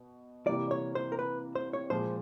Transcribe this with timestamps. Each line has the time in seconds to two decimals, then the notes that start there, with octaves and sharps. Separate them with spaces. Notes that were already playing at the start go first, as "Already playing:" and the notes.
Already playing: B2
0.47 C3 E3 G3 A#3 D5
0.71 C#5
0.95 C5
1.12 A#4
1.19 B4
1.56 C5
1.73 C#5
1.90 A#2 F3 G#3 C5